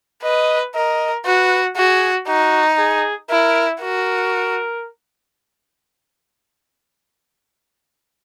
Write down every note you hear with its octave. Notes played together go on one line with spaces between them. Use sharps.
B4 D#5
A#4 D#5
F#4 B4
F#4 G#4
D#4 F#4
G#4
E4 A#4
F#4 A#4